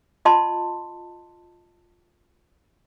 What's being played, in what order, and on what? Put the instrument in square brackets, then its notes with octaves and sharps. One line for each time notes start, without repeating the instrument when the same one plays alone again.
[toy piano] F4 D#5 A5 C6